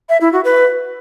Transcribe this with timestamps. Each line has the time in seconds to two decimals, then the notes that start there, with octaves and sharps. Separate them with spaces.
0.09 E5
0.21 E4
0.33 F#4
0.44 B4